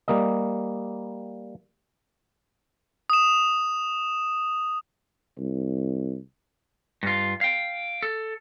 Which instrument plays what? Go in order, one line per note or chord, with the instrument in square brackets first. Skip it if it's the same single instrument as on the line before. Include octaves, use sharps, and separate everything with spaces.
[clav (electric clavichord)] G3 A#3 D#5
[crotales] D#6 E7
[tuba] C2
[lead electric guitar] G2 F4
F5 G5
A4